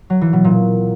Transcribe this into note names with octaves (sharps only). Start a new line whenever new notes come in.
F#3
E3
B2
A#2